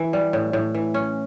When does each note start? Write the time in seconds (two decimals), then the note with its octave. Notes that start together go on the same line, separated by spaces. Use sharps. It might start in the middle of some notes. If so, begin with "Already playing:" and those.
Already playing: E3
0.13 G3
0.33 A2
0.53 A2
0.75 E3
0.94 C#4